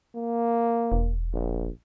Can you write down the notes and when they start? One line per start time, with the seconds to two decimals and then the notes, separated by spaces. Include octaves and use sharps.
0.15 A#3
0.92 E1
1.34 A#1